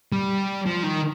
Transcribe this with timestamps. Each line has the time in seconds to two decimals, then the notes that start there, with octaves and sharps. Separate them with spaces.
0.12 G3
0.66 F3
0.83 D#3